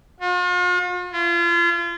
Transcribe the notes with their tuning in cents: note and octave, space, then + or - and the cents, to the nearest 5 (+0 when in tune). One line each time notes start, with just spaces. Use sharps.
F4 +45
F4 -35